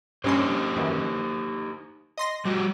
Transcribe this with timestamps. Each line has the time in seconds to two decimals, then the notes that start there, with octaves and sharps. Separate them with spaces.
0.24 G2 C#4 D#4 G4 C5 C6
0.76 F#2 D#3 E3
2.18 D#5 C6 A#6
2.45 G3 F#4 G4